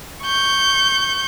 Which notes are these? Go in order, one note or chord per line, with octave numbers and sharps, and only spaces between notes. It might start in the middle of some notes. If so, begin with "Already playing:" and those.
C#6 G6